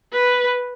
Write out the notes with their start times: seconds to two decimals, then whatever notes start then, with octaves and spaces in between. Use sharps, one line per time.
0.13 B4